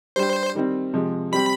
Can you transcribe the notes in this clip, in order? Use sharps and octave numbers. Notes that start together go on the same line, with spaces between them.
G3 D4 G4 C5
D#3 G3 C4
C3 F3 G#3
G3 C4 G4 B5